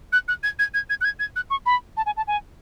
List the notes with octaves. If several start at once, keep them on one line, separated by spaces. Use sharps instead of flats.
F#6
F#6
G#6
G#6
G#6
G#6
F#6
G#6
G#6
F#6
C#6
B5
A5
G#5
A5
G#5